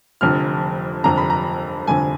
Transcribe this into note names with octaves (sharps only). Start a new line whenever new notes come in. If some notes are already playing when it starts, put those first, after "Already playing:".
F1 F2 D3 F6
F1 F2 D3 A#5
B5
A#5
F1 F2 D3 G#5